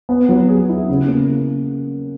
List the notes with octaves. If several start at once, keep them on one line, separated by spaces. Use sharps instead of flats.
B3
F#3
G#4
E4
C#3
A#3